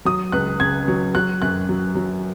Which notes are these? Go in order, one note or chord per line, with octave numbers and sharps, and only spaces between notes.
F#3 D#6
C#2 F#6
C#3 G#6
F#3
F#3 F#6
F#2 F#6
F#3
F#3